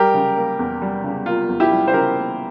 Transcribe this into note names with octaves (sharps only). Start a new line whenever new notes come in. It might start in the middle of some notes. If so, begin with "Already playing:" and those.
Already playing: G3 G4 A#4
C#3
A#3
E2
G3
C#3
A#3 F4
E2
E4 G4
G3
C5
C#3 G4 A#4
A#3